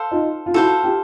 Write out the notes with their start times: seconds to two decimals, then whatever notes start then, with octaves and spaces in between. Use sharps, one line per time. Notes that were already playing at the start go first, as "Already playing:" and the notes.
Already playing: A4 C5 F5
0.11 D#4 F4
0.46 F4
0.54 E4 F#4 A4 C5 F5
0.83 F4 G4